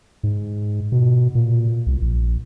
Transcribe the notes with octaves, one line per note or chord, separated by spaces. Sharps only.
G#2
B2
A#2
C2
A#1